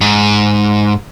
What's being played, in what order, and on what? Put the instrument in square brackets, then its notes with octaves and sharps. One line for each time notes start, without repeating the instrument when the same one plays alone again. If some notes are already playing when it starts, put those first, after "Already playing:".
[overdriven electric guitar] G#2